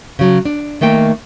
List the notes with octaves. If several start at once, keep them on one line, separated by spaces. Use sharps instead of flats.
C#3 F#3
D4
D#3 A3 A#3 G5